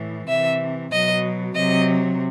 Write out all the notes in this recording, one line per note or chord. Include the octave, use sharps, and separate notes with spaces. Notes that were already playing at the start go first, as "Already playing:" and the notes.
Already playing: A2 E3
C3 E3 E5
B2 F#3 D#5
C3 F#3 D#5